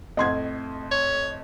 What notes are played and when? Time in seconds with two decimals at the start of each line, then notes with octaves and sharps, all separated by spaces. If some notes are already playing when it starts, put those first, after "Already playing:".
0.17 F2 A2 D#5 C6 G#6
0.91 C#5